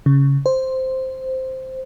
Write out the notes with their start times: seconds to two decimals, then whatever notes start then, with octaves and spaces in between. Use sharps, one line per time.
0.06 C#3
0.46 C5